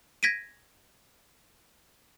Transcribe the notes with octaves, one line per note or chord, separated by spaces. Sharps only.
G#6 A#6 B6 D7 D#7